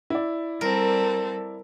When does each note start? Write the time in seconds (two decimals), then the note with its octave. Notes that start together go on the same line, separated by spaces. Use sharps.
0.10 E4 D5
0.61 G3 C4 A4 A#4